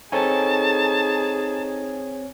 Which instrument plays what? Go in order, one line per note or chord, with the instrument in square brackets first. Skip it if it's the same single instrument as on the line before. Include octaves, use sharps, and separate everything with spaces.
[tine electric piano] C4 C#5 G#5 [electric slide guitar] D#4 A4 [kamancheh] G#4 [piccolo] A5